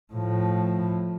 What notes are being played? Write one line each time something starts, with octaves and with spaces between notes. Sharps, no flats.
A2 F3